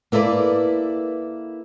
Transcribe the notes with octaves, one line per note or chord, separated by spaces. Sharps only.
A#3 E4 A4 B4 D5